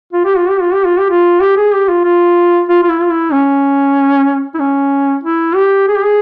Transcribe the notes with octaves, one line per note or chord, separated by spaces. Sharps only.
F4
G4
F4
G4
F4
G4
F4
G4
F4
G4
G#4
G4
F4
F4
F4
F4
E4
F4
E4
C#4
E4
C#4
E4
G4
G#4
G4
G#4